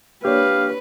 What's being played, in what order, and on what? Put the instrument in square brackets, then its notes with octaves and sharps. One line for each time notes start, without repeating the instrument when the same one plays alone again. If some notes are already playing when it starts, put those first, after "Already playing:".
[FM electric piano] A#3 D4 C#5 [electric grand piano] G4 [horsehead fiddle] B4 [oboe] F5